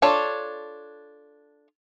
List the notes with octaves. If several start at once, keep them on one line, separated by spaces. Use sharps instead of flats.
D4 F4 A4 C#5